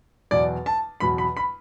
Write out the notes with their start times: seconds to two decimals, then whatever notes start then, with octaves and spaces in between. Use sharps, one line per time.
0.31 E2 B2 F#3 D5
0.66 A5
1.00 E2 B2 F#3 B5
1.18 B5
1.37 B5